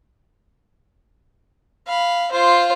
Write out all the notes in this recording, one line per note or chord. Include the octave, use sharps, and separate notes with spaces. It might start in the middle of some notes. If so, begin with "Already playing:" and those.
F5 B5
F4 C5